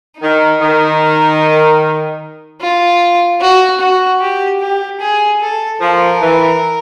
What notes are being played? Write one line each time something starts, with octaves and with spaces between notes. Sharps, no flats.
D#3 D#4
D#3
F4
F#4
F#4
G4
G4
G#4
A4
F3 A#4
E3